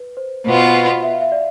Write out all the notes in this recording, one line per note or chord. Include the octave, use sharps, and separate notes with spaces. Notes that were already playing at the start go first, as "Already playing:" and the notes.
Already playing: B4
C5
B2 B3 F4 C5
E5
F5
E5
D5